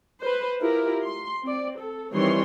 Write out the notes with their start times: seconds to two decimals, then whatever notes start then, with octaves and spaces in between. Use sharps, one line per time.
0.21 B4 C5
0.60 E4 F4 G4 A#4
1.04 C6
1.42 C4 D5
1.78 A4
2.12 D#3 E3 G3 C4 C#5 C6